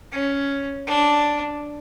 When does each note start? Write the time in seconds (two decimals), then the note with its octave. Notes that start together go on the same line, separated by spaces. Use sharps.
0.12 C#4
0.87 D4